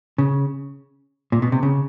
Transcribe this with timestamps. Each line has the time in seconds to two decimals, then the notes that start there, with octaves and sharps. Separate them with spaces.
0.18 C#3
1.32 A#2
1.42 B2
1.52 C3
1.63 C#3